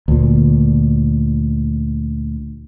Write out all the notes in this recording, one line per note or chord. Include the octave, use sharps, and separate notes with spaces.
D2 A#2